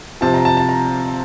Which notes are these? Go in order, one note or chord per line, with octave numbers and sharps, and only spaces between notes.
C3 F3 A5
A#5
A5
A5
A#5